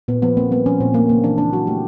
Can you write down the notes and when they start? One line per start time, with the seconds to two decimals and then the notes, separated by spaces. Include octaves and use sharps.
0.08 A#2 B3
0.22 F3 B3
0.37 A#3 C4
0.51 G3 B3
0.66 F3 C#4
0.80 A#2 C4
0.94 A3 A#3
1.09 C#3 A#3
1.24 E3 D4
1.38 A#3 D4
1.53 F#3 F#4
1.67 A3 G4